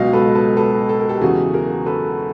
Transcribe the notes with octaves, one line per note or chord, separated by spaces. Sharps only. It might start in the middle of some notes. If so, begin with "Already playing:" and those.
Already playing: C#2 B2 F#3 D#5 F5
A4 B4
A4 B4
A4 B4
A4
A#4
G4 A4
E2 C#3 F#3 F#4 G#4
G#4 A#4
A4 B4